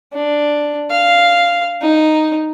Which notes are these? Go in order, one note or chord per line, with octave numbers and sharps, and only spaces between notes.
D4
F5
D#4